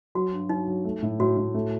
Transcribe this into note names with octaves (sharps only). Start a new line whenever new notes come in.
F#3 F#4
G2
F#3 D#4
F#3
A3
A2
A2 F#4
A2
A3